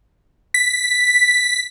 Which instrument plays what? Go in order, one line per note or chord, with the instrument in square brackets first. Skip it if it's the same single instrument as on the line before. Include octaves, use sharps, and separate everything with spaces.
[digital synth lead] B6